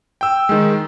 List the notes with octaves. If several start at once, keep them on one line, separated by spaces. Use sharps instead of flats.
G5 E6
D#3 G#3